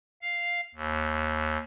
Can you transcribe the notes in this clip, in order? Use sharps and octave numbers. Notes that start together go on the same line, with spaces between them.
F5
D#2